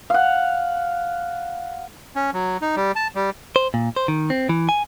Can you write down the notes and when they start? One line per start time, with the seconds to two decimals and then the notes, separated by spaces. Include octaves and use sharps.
0.10 F5 F#5
2.16 C#4
2.33 F#3
2.62 D#4
2.76 G3
2.96 A5
3.15 G3
3.56 C5
3.74 A#2
3.96 C5
4.08 D#3
4.30 C4
4.49 E3
4.69 G#5